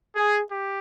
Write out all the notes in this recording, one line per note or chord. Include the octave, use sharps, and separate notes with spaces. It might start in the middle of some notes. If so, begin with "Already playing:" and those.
G#4
G4